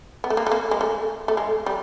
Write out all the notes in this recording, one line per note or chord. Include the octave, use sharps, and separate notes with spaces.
B3
A3
A#3
A3
A#3
G#3
A3
A3
G#3
G3